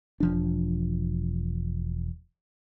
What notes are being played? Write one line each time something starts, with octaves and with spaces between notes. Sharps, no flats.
E1 F3 D4